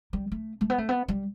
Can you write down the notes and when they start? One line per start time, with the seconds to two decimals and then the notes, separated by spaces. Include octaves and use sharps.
0.13 G3
0.32 A3
0.61 A3
0.70 B3
0.78 A3
0.89 B3
1.08 G3